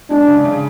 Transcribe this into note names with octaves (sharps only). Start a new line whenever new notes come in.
G#3 D4
C#3
C#3